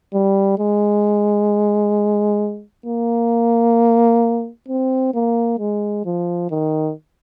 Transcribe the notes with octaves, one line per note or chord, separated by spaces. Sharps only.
G3
G#3
A#3
C4
A#3
G#3
F3
D#3